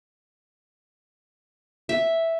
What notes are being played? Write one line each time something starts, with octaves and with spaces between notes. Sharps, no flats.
E5